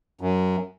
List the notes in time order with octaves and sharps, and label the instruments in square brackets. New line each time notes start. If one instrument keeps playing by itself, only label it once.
[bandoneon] F#2